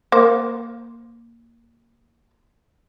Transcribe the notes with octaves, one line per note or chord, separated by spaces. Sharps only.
A#3 C5